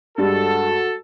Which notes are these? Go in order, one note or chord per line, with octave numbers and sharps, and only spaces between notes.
G2 G3 G#3 F#4 A4